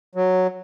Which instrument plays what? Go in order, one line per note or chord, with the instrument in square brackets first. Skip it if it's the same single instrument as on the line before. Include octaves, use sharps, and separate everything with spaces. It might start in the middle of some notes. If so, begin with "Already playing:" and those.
[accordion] F#3